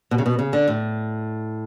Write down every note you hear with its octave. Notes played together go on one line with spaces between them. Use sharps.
B2
C#3
B2
C#3
D3
A2